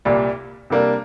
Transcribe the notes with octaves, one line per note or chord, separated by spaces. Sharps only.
C2 A#2 G3
C3 G3 A#3 D4